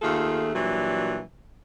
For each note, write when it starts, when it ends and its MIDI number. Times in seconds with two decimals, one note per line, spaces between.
0.02 0.50 39
0.02 0.50 57
0.02 0.50 65
0.02 0.50 68
0.02 0.50 69
0.55 1.21 46
0.55 1.21 52
0.55 1.21 54
0.55 1.21 55
0.55 1.21 62